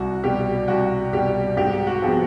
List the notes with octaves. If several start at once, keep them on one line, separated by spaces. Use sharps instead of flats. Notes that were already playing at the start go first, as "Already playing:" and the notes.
Already playing: C2 F#4
B2 G3 G4
C2 F#4
B2 G3 G4
G#2 G4
F#4
F3 G#3 B3